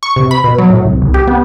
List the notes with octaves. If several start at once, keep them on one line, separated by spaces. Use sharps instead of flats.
C#6
C3
B5
B2
F#3
A2
C2
C2
G4
B3